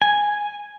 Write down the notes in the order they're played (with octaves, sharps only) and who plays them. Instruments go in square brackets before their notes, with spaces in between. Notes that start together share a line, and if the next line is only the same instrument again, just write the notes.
[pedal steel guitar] G#5